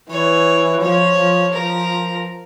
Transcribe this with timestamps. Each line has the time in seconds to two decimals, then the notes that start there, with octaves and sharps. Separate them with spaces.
0.10 E3 C#5
0.81 F3 C#5
1.17 F3
1.53 F3 A#4